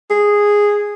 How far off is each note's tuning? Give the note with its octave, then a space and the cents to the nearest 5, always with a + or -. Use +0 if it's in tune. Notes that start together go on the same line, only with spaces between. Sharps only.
G#4 -10